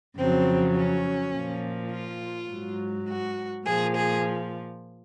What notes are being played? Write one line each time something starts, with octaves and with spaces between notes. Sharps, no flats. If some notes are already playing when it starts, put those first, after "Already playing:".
F2 C#3 F#3 C4
C#4
A#2 F3
F4
G#2 F#3
F#4
A#2 F3 G#4
G#4